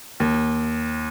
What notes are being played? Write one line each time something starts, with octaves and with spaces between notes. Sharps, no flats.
D#2